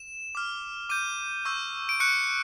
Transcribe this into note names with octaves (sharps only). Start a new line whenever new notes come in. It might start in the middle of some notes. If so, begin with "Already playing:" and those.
Already playing: E7
D6 F6
D6 G6 D#7
C#6 E6 G6
D7
C#6 F#6 C#7